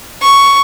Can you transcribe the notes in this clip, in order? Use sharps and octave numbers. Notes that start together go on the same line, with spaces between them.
C#6